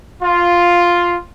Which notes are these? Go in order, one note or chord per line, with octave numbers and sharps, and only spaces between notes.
F4